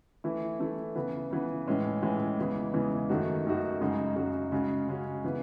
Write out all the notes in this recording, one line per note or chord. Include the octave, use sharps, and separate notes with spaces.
E3 A3 E4
E3 A3 E4
C#3 E3 B3
C#3 E3 B3
A2 E3 G#3 C#4
A2 E3 G#3 C#4
E2 C#3 E3 G#3
E2 C#3 E3 G#3
F#2 D#3 A3 D#4 F#4
F#2 D#3 A3 D#4 F#4
F#2 C#3 G#3 D#4 F#4
F#2 C#3 G#3 D#4 F#4
C#3 G#3 C#4 F#4
C#3 G#3 C#4 F#4
C#3 E3 B3